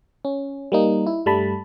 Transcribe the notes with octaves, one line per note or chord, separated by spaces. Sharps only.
C#4
G3 A#3 D#4
E4
G2 G3 A3 A5 B5